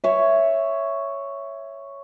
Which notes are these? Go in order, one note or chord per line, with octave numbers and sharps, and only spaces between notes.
C#5 E5